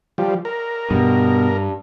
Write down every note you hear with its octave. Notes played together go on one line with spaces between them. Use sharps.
F3 G3
A#4
G2 B2